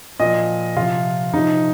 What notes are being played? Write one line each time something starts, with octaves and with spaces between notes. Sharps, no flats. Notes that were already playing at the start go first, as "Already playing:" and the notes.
A#2 F3 D#5
C3 F3 F4
C3 F3 D#4